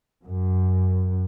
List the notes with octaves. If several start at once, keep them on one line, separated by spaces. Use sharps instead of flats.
F#2